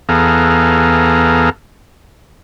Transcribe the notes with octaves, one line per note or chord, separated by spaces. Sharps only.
E2 B3 G#4 A4 F5 A#5